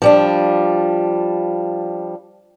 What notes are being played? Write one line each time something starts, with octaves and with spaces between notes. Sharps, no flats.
F3 G3 D4